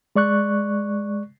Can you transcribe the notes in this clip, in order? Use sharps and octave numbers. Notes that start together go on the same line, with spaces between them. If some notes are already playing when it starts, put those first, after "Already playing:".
G#3 D5 C#6 F#6